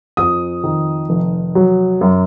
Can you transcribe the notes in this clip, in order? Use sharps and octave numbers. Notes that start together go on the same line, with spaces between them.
F2 D#6
D#3
F1
F#3
F#2